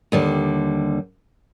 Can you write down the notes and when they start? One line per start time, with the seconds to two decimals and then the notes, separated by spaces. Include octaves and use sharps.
0.12 D#2 D3 G3